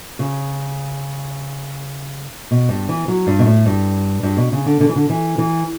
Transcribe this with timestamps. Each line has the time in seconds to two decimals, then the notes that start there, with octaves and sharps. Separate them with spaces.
0.19 C#3
2.51 B2
2.69 G2
2.89 E3
3.08 F#3
3.27 G2
3.39 B2
3.46 A2
3.66 G2
4.23 G2
4.37 B2
4.52 C#3
4.66 D3
4.80 D3
4.89 E3
4.96 D3
5.10 E3
5.38 E3